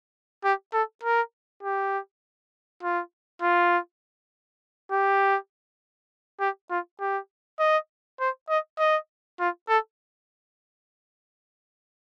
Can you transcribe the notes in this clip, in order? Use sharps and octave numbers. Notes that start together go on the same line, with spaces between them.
G4
A4
A#4
G4
F4
F4
G4
G4
F4
G4
D#5
C5
D#5
D#5
F4
A4